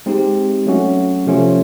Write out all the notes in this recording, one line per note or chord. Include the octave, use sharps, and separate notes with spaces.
G#3 C4 D#4 G4
F#3 A3 C#4 F#4
C3 F3 A3 C#4 F4